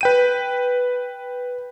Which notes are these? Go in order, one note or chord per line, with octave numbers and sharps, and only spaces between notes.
B4 G5 D#7